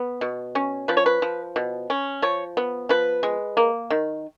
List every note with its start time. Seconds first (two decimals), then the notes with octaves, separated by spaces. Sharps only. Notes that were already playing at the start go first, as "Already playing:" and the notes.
Already playing: B3
0.21 B2
0.55 C#4
0.88 F3 B4
0.97 C#5
1.06 B4
1.22 F3
1.56 B2
1.90 C#4
2.22 F3 C#5
2.57 B3
2.89 F3 B4
3.23 G#3
3.57 A#3
3.90 D#3